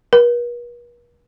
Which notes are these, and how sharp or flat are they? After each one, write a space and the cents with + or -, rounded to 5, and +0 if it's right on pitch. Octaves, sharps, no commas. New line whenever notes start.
B4 -45